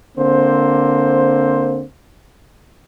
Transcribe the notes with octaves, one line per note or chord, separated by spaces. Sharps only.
D3 A#3 C4 C5